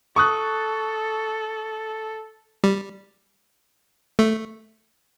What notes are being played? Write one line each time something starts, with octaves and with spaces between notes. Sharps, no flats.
A4 C#6 D#6 F#6
G3
A3